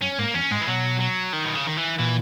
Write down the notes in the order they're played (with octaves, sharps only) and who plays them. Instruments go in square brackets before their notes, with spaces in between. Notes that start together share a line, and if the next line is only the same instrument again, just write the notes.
[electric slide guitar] F#2 [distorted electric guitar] C#4
[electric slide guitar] G#2 [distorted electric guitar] A#3
[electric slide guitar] E2 [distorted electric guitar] C#4
[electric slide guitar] G#2 [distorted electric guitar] G#3
[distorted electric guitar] E3
[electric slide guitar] B2 [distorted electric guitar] F#3
[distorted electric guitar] F#3
D#3
B2
C#3
D#3
E3
[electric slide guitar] A#2 [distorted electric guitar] E3